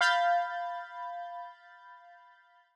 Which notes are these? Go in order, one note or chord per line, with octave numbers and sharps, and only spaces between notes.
F5 B5 G6 A6